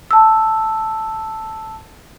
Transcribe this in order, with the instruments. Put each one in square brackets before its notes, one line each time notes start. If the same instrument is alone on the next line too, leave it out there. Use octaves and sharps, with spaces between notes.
[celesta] A5 E6